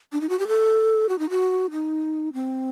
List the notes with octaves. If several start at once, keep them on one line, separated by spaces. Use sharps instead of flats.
D4
D#4
F#4
G4
A4
F#4
D#4
F#4
D#4
C4